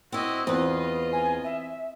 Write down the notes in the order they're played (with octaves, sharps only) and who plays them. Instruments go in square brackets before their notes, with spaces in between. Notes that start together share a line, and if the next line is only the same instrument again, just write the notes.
[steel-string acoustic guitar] C4 E4 [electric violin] F#4 D#5
[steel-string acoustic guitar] E2 B4 [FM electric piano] E3 C4 [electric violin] F4 D#5
[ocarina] G#5
E5